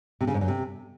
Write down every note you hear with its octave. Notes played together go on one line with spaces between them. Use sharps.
C3
C#3
G#2
F#2
C3